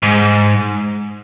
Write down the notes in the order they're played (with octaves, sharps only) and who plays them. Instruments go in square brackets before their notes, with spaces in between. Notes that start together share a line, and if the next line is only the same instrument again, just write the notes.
[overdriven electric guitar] G#2